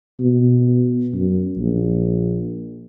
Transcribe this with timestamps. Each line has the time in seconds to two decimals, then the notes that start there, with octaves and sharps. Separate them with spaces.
0.20 B2
1.14 F#2
1.58 A#1